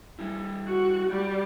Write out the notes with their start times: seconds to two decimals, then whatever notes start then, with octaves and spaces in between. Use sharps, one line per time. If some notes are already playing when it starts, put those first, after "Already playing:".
0.19 G3 D4 E4
0.68 F#4
1.10 G3